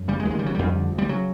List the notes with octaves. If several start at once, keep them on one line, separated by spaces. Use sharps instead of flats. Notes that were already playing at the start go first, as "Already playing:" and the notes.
Already playing: F#2
C#3 G3
G#3
D#2
G#3
G3
C#3 F#3
F2 G3
D3
D2
G3
C#3 F#3